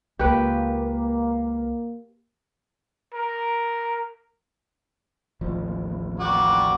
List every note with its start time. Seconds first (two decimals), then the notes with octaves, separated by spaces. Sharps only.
0.19 C#2 A#3 G4 B4
3.14 A#4
5.41 A1 D#2 F3
6.19 G3 A#3 F#4 D6